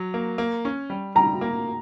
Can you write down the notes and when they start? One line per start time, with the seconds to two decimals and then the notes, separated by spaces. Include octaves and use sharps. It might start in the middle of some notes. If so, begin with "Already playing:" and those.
Already playing: F#3
0.14 A#3
0.38 A#3
0.65 C#4
0.90 G3
1.15 G3 A#5
1.41 A#3